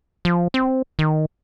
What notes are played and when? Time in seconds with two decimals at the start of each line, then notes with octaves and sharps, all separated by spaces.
0.25 F3
0.54 C4
0.99 D#3